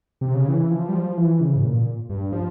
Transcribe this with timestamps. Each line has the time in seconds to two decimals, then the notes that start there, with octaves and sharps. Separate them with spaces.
0.21 C3
0.34 C#3
0.48 E3
0.71 F3
0.89 G3
0.95 F3
1.17 E3
1.40 C#3
1.56 G#2
1.63 A#2
2.10 G2
2.32 F3